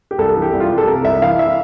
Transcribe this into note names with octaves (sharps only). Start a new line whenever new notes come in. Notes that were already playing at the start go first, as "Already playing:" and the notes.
G4
C2 A4
E3
G4
C2
F4
G4
C2
A4
C3 A#4
C2 E5
E3 F5
E5